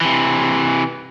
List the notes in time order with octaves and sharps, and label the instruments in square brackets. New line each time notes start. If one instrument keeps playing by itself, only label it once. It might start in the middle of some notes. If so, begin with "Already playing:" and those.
[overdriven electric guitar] C3 E3